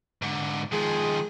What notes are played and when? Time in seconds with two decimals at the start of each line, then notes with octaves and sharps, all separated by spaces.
0.22 G#2 D3
0.72 D#3 F3 G#3 G#4